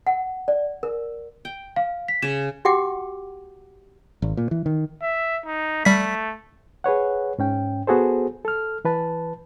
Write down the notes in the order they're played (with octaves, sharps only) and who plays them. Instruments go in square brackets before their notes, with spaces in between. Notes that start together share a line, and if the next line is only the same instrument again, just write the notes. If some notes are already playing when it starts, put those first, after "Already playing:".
[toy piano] F#5
D5
A#4
[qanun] G5
[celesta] F5
B6
[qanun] C#3 [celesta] E7
[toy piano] F#4 G4 F#5 G5 D6
[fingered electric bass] G#1
A#2
E3
D#3
[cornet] E5
D#4
[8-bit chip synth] G3 B6 [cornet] A3
[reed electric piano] G#4 B4 C#5 F#5
G#2 C#4 G5
B3 F#4 G#4 A4 C5
A4 F6
E3 B4 A5